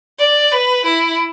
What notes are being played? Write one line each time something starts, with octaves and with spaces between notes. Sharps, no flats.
D5
B4
E4